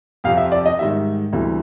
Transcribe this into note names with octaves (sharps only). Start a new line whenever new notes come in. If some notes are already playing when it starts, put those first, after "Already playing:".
F2 C3 F3 F5
E5
D5
D#5
G#2 D#3 G3 E5
D2 C3 E3 G3